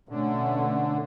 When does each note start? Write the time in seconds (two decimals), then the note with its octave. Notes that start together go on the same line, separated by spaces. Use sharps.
0.09 B2 D3 A3 C#4